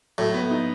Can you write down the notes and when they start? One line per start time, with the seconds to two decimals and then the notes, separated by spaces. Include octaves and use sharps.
0.18 A2 F#3
0.34 B3
0.51 D#4